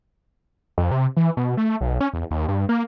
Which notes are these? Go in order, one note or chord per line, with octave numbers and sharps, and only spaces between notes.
F2
C3
E3
B2
A3
B1
C#4
E2
D#2
G2
A#3